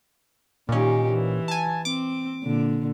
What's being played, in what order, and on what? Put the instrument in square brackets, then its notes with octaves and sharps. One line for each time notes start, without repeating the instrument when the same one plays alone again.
[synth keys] A#2 C#4 [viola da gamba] D#3 D#4 G4
[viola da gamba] E3
[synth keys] G#5 A5
[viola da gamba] C4 [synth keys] D6
[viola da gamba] A#2 D3